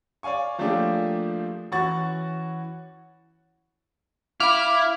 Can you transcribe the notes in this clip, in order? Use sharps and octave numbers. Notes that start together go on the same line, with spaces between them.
C#5 D5 F5 G#5 C#6
F3 A3 A#3 D4 G4 G#4
E3 C#4 F#4 F#5 C#6 A6
E4 F5 B5 D6 F6